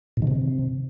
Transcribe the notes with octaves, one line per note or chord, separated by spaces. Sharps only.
A#2
D#3
C3